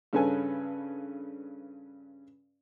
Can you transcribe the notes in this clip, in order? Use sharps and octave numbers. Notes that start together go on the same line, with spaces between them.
G2 C#3 C#4 A4 B4 G#5